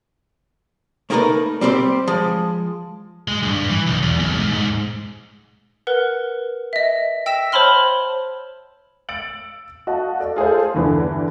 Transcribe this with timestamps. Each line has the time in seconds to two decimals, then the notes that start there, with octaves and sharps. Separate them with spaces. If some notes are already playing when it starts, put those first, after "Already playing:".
1.10 A3 A#3 D#4 G4 A#4 B4
1.61 G3 C4 G4 C5 D5
2.07 F3 G#3
3.28 G#3
3.43 G2
3.70 E3
3.87 B1
4.02 E2
4.20 B1
4.35 G#2
4.52 G#2
5.87 A#4 B4 F#5
6.73 D#5 E5
7.26 G5 E6 A#6 B6 E7
7.52 C5 C#5 A5 B5 C6 F6
9.09 E6 A6 C#7 D7 F#7
9.87 F#4 D#5 F5 A5
10.20 A4 D5
10.36 F4 G#4 A4 C5
10.74 E2 G2 D3 E3